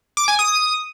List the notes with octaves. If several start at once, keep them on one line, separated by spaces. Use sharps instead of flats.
D6
G#5
D#6